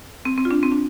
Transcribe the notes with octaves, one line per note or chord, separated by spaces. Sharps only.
C4
C4
F4
D4
C4
D4